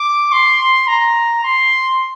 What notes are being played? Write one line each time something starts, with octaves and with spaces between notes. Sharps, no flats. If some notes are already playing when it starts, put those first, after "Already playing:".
Already playing: D6
C6
A#5
C6